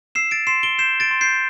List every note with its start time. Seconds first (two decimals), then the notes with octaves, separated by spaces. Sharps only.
0.15 E6 C7 E7
0.31 A6 D7
0.47 C6 C7 E7
0.63 D7 G7
0.78 G6 C7 E7
1.00 A6 D7
1.11 C6
1.21 G6 C7